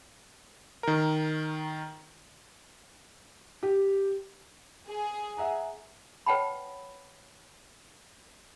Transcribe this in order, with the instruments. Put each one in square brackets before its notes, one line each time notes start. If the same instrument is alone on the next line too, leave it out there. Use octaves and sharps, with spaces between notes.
[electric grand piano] D#3 A#4
[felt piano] G4
[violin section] G#4
[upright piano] E5 F#5 A#5
[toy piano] B4 C#5 F#5 G5 A5 B5